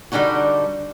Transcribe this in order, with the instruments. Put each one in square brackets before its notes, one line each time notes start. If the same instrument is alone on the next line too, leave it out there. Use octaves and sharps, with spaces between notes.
[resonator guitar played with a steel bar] D3 G3 D4 D#4 F#4